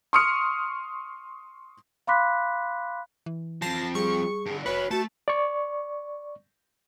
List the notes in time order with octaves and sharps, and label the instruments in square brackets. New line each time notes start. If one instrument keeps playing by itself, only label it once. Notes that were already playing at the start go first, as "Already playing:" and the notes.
[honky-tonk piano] C6 C#6 D#6 F6 C#7
[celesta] F5 B5 C6 D6 F#6 B6
[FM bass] E3
[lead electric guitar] F2 F3 [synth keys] A5 A#6 C7
[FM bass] G3 [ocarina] G#4 [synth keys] C#6
[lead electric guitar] G2 D3
[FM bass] F1 [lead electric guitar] F#4 E5 [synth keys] B4 [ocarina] C#5
[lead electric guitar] A3 [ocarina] F#4 [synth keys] A5
[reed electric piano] D5 C#6